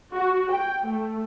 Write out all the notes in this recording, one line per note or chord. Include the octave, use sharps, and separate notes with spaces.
F#4
G5
A3